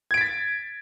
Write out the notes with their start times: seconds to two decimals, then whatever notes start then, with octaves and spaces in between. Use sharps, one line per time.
0.11 G#6
0.14 D7
0.17 B6
0.21 A6